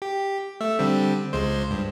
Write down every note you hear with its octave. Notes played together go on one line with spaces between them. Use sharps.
G4
A3 E5
D3 G3 C4
C#2 G#3 C5
G2